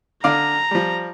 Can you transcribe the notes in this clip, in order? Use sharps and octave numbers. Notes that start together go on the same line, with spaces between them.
D3 D5 F5 A#5
F3 G3